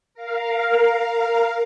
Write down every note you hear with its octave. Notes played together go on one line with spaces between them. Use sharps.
A#4 F5